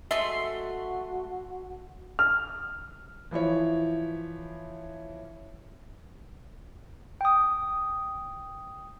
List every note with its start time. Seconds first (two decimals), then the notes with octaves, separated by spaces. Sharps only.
0.11 G#3 A3 F#4 E5 C6
2.19 F6
3.31 E3 F3 E4 C#5
7.21 G5 D#6